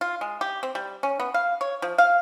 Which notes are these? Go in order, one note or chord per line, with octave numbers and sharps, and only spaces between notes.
F4
G#3
G4
C4
G3
C#4
B3
F5
C#5
F3
F5